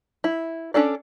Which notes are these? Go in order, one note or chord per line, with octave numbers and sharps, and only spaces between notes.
E4
C#4 D4 A4 D5